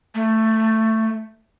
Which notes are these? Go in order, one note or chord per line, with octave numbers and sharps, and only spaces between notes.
A3